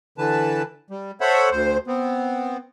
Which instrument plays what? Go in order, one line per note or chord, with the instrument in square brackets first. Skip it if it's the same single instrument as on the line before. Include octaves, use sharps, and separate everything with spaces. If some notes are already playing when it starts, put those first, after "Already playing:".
[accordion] D3 E3 B4 A5
G3
A4 C5 C#5 E5 F#5 B5
D2 C5
B3 C4